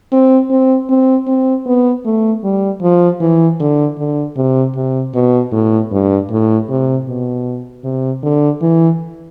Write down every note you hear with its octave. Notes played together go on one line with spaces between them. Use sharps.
C4
C4
C4
C4
B3
A3
G3
F3
E3
D3
D3
C3
C3
B2
A2
G2
A2
C3
B2
C3
D3
E3